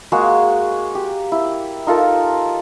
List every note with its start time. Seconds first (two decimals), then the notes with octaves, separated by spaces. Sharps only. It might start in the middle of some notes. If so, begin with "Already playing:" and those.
0.12 G#3 A#3 F#4 G#4
0.95 G4
1.32 E4
1.87 D#4 F4 A4 A#4